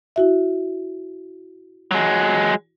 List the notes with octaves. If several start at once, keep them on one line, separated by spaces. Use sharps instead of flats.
E4 F#4 E5
F#3 G#3